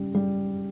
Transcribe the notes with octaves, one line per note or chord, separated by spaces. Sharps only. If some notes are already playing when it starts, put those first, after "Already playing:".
Already playing: C#3 G3
G3